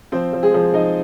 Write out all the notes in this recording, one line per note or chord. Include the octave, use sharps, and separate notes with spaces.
F3 C4 C5
F3
G#3 G#4
F3
F3 D#4 D#5